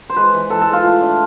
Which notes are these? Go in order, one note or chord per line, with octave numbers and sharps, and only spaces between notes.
C5
G#3 B4
E3
E3 A4
A4
G#3
F4
A3
D4